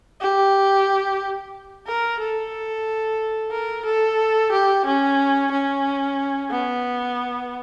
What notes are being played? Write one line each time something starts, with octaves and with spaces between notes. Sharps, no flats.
G4
A#4
A4
A#4
A4
G4
C#4
C#4
B3